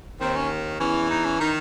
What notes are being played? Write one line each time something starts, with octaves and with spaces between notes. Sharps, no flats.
D#2 D#3 C4
C#4
E2 E3 C#4
D#4
C#4
D#3 D#4